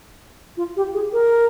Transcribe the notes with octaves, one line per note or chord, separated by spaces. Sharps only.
F4
G4
G#4
A#4